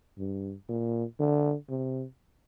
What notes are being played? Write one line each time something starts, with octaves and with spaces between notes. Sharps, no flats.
G2
A#2
D3
C3